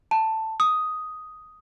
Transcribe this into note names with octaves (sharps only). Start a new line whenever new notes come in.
A5
D#6